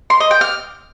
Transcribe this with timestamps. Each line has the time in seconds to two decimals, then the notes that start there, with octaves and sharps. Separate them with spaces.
0.10 C6
0.20 D#5
0.31 G5
0.41 F6